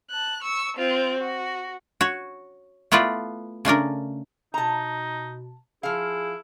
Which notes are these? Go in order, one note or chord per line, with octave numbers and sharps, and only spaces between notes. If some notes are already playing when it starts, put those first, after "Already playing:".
A5 F#6
C#6 E6
C4 F4
F#4
F#4 C#5
A3 B3 E4 F4 B4 D5
C#3 A3 D4 A#4
B2 D#4 A5 A#5
F3 E4 G#4 F5